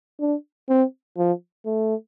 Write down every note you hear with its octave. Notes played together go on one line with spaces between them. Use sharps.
D4
C4
F3
A3